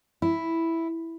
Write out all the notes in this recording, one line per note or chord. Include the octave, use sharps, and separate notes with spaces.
E4